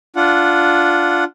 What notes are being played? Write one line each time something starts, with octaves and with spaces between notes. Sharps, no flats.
D4 F4 F#5